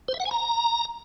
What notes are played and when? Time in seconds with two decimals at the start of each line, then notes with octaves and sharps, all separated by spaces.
0.08 C5
0.14 E5
0.20 F#5
0.25 G#5
0.31 A#5